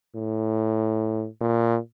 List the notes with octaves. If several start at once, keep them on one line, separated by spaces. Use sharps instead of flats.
A2
A#2